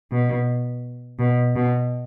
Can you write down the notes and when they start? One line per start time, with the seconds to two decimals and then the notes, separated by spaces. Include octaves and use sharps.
0.11 B2
1.19 B2
1.56 B2